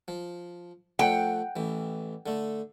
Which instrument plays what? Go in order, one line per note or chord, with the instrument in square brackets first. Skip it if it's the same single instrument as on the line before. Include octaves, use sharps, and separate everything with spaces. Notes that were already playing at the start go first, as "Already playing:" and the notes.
[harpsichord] F3
[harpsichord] F3 A3 [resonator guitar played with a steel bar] F#5 G5
[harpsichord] A1 E3
D3 A3